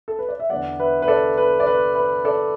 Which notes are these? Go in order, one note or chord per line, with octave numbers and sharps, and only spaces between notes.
A4
B4
D5
E5
E2 D3 B3 D5 F#5
B4 E5
B4
A4 D5
B4
D5
B4
B4
A4 D5